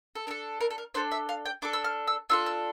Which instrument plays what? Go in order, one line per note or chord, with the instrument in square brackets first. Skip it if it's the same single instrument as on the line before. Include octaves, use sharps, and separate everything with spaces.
[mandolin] A4
D4 A#4
A4
A#4
A4
A#4
D4 A4 C5
E5
F5
G5
D4 A4 D6
E6
F6
E6
D4 F4 A4 E6
E6